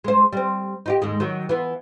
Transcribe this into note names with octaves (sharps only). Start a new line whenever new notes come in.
G#3 C5
G3 C4
D#4 F4 G4
D#2 G#2 G#3
D#3 F#3
E3 B3